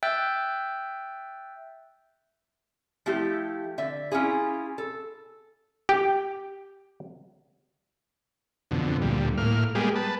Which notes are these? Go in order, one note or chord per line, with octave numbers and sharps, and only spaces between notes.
E5 G5 E6 F#6 G6 A6
F3 A3 E4 G4
D3 E5
C#4 E4 F4 G#4
A4
G4 G5
F2 B2 D3
D2 A#2 G3
A2 A#3 F6
G3 G#3 A#3 B3 G4 G#4
B4 A5